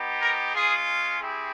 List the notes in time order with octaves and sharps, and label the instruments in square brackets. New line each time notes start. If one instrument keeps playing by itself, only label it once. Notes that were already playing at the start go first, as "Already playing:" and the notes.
Already playing: [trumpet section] B3 D#4 G4
A#4
G#3 C#4 F4 G#4
C4 E4 G4 G#4